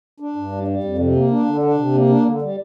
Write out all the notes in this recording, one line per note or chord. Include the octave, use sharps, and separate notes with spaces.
D4
G2
G3
G3
F2
C3
A#3
D4
D3
D4
C3
A#3
D4
D3
G3